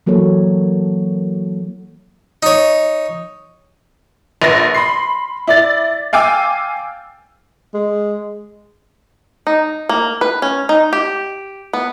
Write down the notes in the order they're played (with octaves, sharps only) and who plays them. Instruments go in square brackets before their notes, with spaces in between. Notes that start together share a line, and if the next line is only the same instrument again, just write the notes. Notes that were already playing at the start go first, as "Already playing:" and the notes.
[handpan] E3 F#3 A#3 A4 C#5
[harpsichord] D#4 C#5
[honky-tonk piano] A#1 B4 A#6
B5 C6 C7
E4 D5 A6
F5 G5 G#5 D6 E6
[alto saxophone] G#3
[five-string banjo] D#4
A#3
B4
C#4
D#4
G4
B3